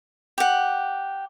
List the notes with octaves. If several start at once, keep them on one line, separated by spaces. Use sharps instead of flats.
G4 F#5